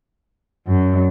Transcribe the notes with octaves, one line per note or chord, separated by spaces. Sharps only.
F#2